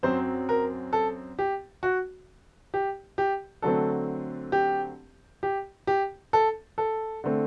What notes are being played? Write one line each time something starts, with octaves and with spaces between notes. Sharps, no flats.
F#2 F#3 C4 C5
A#4
A4
G4
F#4
G4
G4
D3 F#3 A3 C4 A4
G4
G4
G4
A4
A4
D3 A3 C4